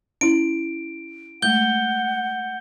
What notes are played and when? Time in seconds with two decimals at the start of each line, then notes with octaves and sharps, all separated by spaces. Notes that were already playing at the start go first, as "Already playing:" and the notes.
0.21 C#4 E4 D7
1.42 G#3 A3 F#5 G6 G7